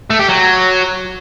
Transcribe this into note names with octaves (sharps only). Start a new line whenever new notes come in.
A3
G4
F#3